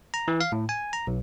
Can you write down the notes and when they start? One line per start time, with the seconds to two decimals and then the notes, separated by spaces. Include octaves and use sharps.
0.14 A#5
0.28 E3
0.41 F5
0.52 A2
0.69 G#5
0.93 A#5
1.07 B1